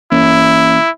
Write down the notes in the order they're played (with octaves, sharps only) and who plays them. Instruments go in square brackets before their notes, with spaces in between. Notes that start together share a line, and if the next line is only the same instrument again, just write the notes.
[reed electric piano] E3 A#3 C#4 [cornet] E4